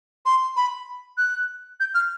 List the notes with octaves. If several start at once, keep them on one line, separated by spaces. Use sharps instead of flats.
C6
B5
F#6
G6
F6